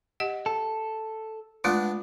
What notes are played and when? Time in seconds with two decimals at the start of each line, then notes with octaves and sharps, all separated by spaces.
0.20 G4 D#5 F#5
0.46 A4
1.64 G#3 A3 B3 D4 F4